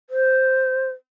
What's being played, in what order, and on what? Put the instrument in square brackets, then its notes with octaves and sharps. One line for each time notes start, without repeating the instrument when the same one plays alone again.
[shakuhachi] C5